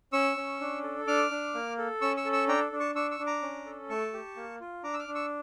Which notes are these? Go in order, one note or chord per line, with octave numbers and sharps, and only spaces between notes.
C#4 C#6 E6
C#4
D4
A4
D4 D6 F6
D4
A#3
A4
C#4 C#6 E6
C#6 E6
A4
C#6 E6
D4 G5 A#5
D4
A5 C#6
D4 C#6 E6
C#6 E6
D4
A#5 D6
C#4
A4
A3 A5 C#6
G4
A#3
F4
D4 A#5 D6
E6
D6 F6
D4
C#6 E6